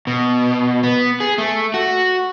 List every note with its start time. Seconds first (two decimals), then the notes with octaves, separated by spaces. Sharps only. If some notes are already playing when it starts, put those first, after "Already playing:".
0.07 B2
0.83 B3
1.20 G#4
1.38 A3
1.74 F#4